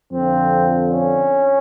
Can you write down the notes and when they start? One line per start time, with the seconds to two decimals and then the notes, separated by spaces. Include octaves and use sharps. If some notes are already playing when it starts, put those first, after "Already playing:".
0.12 F2 D3 F3 C4
0.91 C#4